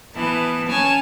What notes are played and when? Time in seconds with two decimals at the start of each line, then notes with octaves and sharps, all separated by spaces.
0.16 E3 B3 A5
0.68 C#4 C#5 G#5 A5